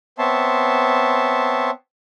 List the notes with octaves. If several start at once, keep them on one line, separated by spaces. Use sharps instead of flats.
B3 C4 C#5 E5 A5 C6